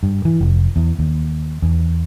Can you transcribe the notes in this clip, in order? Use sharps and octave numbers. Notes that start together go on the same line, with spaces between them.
G2
E3
F1
E2
D#2
E2